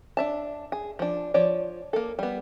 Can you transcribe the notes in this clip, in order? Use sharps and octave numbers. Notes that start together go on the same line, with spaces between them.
D4 E5 A5
G#4
F3 D4
F3 C#5 D5
A#3 A4
G3 B3